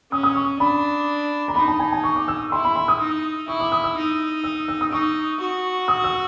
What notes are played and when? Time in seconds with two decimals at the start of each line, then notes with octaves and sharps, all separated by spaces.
0.12 C#4 D#6
0.23 D#6
0.35 C#6
0.59 D4 B5
1.48 A#5
1.56 D#4 B5
1.68 A5
1.79 G#5
1.92 G#5
2.03 C#6
2.16 D6
2.28 E6
2.52 E4 C6
2.65 B5
2.75 C6
2.88 D#6
3.00 D#4
3.48 E4 C#6
3.60 D6
3.72 D#6
3.84 E6
3.97 D#4
4.44 E6
4.68 E6
4.81 D#6
4.92 D#4 C#6
5.40 F#4
5.88 D#6
6.04 E6